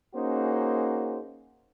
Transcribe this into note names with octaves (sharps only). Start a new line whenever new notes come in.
A#3 C#4 D#4 F#4 G#4 C5